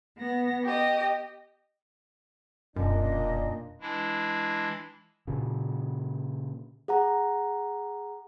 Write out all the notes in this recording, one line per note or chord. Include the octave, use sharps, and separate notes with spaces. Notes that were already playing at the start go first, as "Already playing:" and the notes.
B3 A#6
G4 D#5
E1 F#2 A#2 D4 D#5
E3 G#3 D4 E4
A#2 C#3
G#4 F#5 A#5